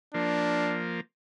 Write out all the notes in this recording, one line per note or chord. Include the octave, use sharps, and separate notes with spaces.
F3 A#3 D4